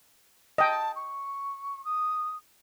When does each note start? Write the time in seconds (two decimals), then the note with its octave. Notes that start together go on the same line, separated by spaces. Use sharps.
0.58 D#5 G5 A5
0.95 C#6
1.84 D#6